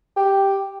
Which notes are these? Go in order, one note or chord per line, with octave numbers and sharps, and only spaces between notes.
G4